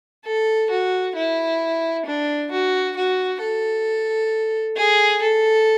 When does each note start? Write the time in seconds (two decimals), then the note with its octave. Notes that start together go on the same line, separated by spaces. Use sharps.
0.25 A4
0.71 F#4
1.15 E4
2.06 D4
2.51 F#4
2.96 F#4
3.41 A4
4.76 G#4
5.22 A4